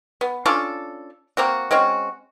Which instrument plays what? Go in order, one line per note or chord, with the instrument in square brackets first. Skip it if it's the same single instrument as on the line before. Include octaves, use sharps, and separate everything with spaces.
[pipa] B3
C#4 D4 F4 A4
A#3 C4 F#4
G#3 C4 C#4 F#4